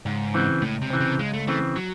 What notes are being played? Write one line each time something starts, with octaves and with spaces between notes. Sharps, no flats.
C#2 G#2
C#3 E3 C4
C#2 A2
C3
C#3 E3 C4
C3
C#2 G#3
A3
C#3 E3 A3 C4
F#3